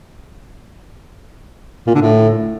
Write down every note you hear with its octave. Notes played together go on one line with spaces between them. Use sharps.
A#2
D3
A2